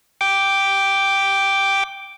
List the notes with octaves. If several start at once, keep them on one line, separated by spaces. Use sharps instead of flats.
G5 D6